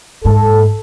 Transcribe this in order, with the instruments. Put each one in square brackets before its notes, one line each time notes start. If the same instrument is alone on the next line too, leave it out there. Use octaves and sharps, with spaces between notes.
[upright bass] G#2 [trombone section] A4